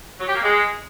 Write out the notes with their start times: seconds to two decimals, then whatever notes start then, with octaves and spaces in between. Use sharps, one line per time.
0.19 F#3
0.27 G4
0.35 A#3
0.43 G#3